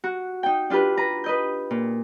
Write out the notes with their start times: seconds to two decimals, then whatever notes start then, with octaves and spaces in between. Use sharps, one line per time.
0.04 F#4
0.43 D#4 G5
0.70 D4 F4 G4 B4
0.97 B4 A#5
1.24 B4 D#5 G6
1.71 A#2